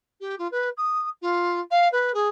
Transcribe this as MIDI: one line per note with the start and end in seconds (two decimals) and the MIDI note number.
0.20 0.35 67
0.38 0.47 65
0.51 0.69 71
0.77 1.08 87
1.21 1.60 65
1.70 1.88 77
1.92 2.12 71
2.14 2.28 68